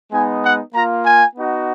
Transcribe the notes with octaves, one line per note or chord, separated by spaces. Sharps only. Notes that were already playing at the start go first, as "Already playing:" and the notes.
G#3 B3 D#4 G#5
F#5
A#3 F4 A#5
G#5
B3 D#4 F#4